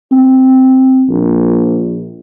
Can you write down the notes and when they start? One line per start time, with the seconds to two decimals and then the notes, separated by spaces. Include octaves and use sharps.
0.12 C4
1.09 A#1